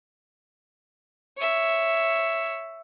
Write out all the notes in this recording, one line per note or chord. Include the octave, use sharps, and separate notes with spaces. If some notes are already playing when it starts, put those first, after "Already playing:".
C#5 E5